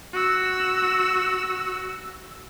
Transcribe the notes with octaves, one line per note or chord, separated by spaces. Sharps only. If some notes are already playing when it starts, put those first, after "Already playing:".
F#4 E6